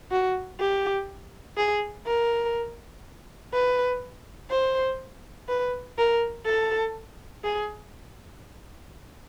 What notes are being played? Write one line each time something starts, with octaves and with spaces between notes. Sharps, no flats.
F#4
G4
G#4
A#4
B4
C5
B4
A#4
A4
G#4